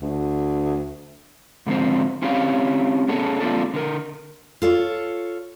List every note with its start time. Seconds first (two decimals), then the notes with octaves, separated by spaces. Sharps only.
0.01 D2
1.66 G#2 D3 F3 G#3 C4 C5
2.22 C4 C#4 E4 G4 C#5 F5
3.08 B3 C#4 G#4 A4
3.40 A3 A#3 C4 D4 F4 A4
3.74 D3 A#4
4.62 F4 A4 C#5